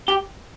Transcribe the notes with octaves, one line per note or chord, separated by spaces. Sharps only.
G4